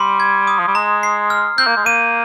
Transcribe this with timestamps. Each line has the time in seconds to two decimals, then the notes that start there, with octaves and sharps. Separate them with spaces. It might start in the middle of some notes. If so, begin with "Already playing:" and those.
Already playing: G3 C6
0.20 G#6
0.47 D#6
0.59 F3
0.67 G3
0.75 G#3 A#5
1.03 C7
1.30 F6
1.58 C4 G6
1.67 A#3
1.76 G#3
1.85 A#3 D#7